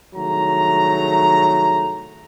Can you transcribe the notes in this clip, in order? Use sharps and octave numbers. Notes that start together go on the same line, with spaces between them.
C2 D#3 F#3 A3 G#4 A#5